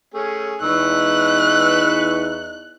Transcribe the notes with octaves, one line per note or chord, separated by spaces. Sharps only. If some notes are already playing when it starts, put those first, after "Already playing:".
A3 C#4 G#4
E2 D#4 B4 C#6 E6 F#6